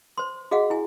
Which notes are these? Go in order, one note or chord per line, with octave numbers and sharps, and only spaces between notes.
C5 C6
F#4 G#4 D#5 F5 F#5
E4 G#5